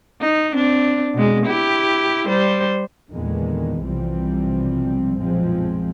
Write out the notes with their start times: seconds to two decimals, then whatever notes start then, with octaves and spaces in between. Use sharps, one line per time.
0.21 D#4
0.53 C4 D4
1.14 B2 G#3
1.46 E4 G4
2.28 G3 C5
3.11 E2 A#2 D3 D#3 G#3 B3
3.82 B1 C3 E3 F3 G3 C4
5.18 B1 F#2 A#2 F3 G#3 C4